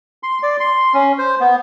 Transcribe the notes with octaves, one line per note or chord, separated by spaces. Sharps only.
C6
D5
C6
C#4
C5
B3